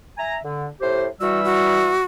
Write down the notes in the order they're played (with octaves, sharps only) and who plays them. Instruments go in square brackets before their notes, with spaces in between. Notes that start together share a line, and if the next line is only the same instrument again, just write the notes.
[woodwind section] E5 G#5 A#5
D3
A2 G4 C5
[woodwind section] E3 G3 E6 [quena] F#4
[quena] F#4